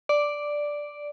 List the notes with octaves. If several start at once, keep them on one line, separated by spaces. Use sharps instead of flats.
D5